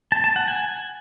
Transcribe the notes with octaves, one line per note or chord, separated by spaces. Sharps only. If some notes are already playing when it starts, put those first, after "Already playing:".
A5
A5
F#5
G#5